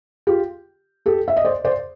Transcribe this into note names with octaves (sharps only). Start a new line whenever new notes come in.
F4 G4
G4 A4
E5
D#5
C5 D5
C5 D5